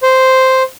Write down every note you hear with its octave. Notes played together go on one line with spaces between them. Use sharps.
C5